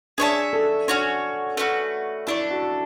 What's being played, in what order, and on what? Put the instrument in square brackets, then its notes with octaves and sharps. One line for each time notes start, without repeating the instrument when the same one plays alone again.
[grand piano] D4 [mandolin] G#4 C#5 E5 A5
[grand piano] A4
[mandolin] C#4 F#4 C#5 [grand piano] D4
[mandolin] A3 C#4 F#4 B4
[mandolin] A3 D4 A4 [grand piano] E4
[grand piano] F#4